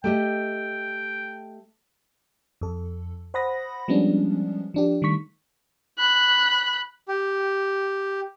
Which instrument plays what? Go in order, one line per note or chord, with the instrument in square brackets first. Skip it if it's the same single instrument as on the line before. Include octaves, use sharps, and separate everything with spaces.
[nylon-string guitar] A3 G4 D#5 [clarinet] G5
[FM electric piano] F2 A4
C5 F#5 B5 D#6 A#6
F3 G3 G#3 B3 C#4 D4
F3 D4 G4
D#3 G3 A3 C#6 B6
[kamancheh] B5 F#6
[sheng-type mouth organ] G4